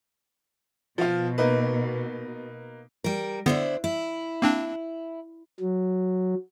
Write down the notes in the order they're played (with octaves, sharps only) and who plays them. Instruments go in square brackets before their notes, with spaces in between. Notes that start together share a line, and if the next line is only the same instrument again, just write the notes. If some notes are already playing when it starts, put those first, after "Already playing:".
[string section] B2 [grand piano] F3 F4
[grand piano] A#3 D#4 B4
[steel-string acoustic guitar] G3 A#4
[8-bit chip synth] D3 B3 [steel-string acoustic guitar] D4 E4 C5
[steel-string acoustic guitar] E4
[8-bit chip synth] A#3 C4 D4
[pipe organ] F#3